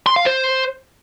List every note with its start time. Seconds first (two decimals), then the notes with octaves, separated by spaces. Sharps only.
0.06 C6
0.16 F5
0.26 C5